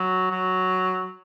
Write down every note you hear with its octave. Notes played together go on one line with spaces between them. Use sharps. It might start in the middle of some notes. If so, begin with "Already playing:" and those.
Already playing: F#3
F#3